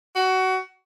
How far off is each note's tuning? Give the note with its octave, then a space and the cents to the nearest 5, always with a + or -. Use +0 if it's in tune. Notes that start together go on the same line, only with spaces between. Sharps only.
F#4 +20